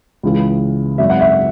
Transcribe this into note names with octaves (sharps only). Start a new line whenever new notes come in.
C#2 C#3 E3
G#1 F#2 D#3 F#3 E5
F#5
E5